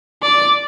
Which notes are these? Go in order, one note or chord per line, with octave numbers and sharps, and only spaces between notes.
D5